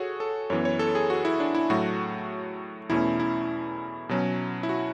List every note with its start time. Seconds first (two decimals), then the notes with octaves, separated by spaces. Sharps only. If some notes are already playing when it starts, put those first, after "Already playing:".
Already playing: F#4 G#4 A4 C#5
0.20 A4
0.50 F#2 E3 B3 C#5
0.65 C#5
0.79 A4
0.95 G#4
1.10 F#4
1.25 E4
1.40 D4
1.55 E4
1.70 A2 F#3 A3 F#4
2.90 E2 B2 A3 C#4 E4
3.20 E4
4.09 B2 F#3 C#4
4.63 E4
4.69 F#4